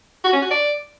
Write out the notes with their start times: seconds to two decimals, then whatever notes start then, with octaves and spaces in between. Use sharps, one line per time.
0.24 F#4
0.33 C#4
0.42 F#4
0.51 D5